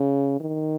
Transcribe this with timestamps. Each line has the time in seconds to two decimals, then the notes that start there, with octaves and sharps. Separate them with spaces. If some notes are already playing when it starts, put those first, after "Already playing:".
Already playing: C#3
0.41 D#3